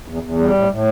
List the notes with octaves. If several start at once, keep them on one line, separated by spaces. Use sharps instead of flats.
E2
E2
G3
A2
A2